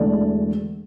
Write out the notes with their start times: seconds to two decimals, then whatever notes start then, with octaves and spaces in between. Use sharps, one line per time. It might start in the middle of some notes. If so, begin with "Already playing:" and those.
Already playing: E1 E2 D3 A3 D5